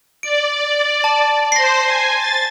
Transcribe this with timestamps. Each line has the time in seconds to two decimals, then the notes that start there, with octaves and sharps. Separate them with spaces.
0.23 D5 D7
1.04 A5
1.52 C5 C6 A#6 C7
1.86 G#5
2.17 A6